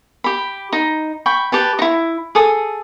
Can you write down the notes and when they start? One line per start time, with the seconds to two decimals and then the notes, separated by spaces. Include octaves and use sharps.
0.24 G4 B5
0.73 D#4
1.26 G5 B5 C#6
1.52 G4 B4 A5
1.79 D#4 E4
2.35 G#4 A4 D#6